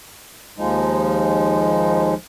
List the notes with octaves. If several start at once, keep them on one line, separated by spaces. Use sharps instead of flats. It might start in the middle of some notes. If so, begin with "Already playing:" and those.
D#2 F3 G#3 D#4